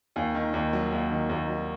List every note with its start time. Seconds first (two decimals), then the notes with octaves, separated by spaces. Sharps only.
0.16 D#2 G#5
0.35 D#3
0.54 D#2
0.73 F#3
0.92 D#2
1.11 D#3
1.29 D#2
1.48 F#3